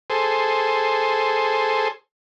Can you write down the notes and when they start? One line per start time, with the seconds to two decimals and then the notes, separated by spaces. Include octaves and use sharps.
0.10 G#4 A4 C5